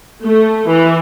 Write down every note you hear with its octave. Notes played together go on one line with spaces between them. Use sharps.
A3
E3